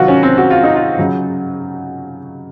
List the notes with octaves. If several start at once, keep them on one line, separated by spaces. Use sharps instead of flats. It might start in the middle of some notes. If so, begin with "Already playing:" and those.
Already playing: C3 D#3 F#3 F4 F#4
C#4
C4
F#4
F4
D#4
F4
C#3 F#3